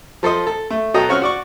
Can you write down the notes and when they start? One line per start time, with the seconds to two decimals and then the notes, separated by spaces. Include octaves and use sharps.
0.23 F3 A4 C5 D#5
0.47 A4
0.70 A3
0.94 B2 F#3 A4 D#5 G5 A#5
1.09 C4 C#4 F#4 C#6 F6
1.22 F#4 D5 C#6